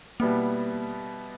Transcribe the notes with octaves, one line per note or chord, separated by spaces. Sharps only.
B2 G3 A#3 B3 E4